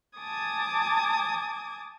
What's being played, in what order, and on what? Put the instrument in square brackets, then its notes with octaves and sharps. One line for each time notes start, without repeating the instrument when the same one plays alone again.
[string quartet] G#5 A5 D6 D#6 G#6